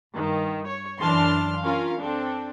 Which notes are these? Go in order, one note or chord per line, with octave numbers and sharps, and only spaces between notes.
G2 D#3
C#5
F#2 E3 D4 A5 C6 F6
C#4 F4 A#4 F5
C4 D4 A4